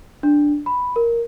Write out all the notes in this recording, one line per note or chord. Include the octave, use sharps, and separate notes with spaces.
D4
B5
A#4